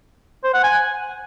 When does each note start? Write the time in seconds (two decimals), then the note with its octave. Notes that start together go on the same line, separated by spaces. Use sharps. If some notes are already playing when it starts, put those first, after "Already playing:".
0.44 C5
0.54 F#5
0.64 G#5